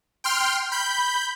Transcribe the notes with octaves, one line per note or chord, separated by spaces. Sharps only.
G5 C6 F6
B5 G6